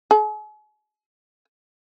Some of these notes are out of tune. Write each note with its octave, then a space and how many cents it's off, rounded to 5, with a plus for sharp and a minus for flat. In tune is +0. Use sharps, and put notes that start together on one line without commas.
G#4 +40